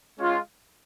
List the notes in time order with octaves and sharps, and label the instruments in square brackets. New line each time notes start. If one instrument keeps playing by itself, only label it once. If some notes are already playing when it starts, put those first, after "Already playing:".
[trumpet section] G#3 C#4 F4